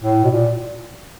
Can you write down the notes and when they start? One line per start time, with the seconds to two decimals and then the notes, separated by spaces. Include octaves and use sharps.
0.03 A2
0.24 B2
0.31 A#2